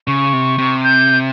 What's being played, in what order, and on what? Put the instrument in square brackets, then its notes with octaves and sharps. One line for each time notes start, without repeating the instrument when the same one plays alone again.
[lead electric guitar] C#3 [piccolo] C#6
[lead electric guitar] C3
C3
[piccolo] G6